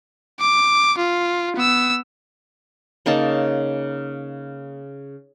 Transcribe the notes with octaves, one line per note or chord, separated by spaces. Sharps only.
D6
F4
B3 E6
C#3 A#3 D#4 A5